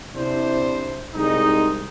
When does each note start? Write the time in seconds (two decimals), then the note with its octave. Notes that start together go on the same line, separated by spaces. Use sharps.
0.14 C3 D4 E4 C5
1.14 C2 G#3 D#4